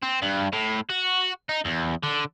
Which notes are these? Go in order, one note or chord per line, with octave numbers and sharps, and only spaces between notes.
C4
G2
A2
F#4
D#4
E2
D3